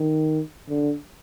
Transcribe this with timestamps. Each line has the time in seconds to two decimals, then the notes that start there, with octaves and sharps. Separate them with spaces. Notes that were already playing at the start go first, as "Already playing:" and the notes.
Already playing: D#3
0.69 D3